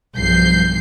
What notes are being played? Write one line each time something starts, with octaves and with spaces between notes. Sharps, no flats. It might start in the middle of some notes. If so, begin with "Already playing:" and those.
B1 G2 F3 G6 C7